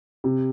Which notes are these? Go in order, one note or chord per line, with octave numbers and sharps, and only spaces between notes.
C3